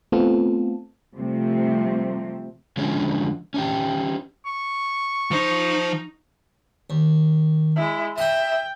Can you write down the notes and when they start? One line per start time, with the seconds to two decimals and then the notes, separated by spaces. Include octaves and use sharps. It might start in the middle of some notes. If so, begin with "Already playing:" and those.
0.12 A3 B3 C4 F4 A4
1.18 C3 F3 G3 A3 C4
2.77 D3 F3 F#3 G#3 C#4
3.54 C#4 D#4 G4
4.46 C#6
5.31 F3 D#4 C5
6.90 D#2
7.76 G#3 E4
8.18 D#5 E5 G5 B5